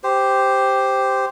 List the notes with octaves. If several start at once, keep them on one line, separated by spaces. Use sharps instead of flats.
G4 C5